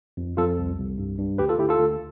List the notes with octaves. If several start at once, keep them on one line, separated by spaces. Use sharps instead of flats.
F2
F2 F4 A4
C2
C2
G2
G2
D2 G4 B4
F4 A4
D2 E4 G4
F4 A4
D2